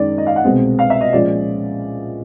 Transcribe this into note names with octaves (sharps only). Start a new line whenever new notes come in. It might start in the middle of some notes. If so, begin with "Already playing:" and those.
Already playing: F#2 D#3 G#3 D5
D#5
F5
F#5
C2 B2 G#3 C4
F5
E5
D#5
A#2 F3 G#3 C#4 D5